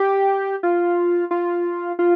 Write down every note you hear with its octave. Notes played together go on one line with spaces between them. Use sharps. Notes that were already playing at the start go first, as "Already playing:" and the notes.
Already playing: G4
F4
F4
F4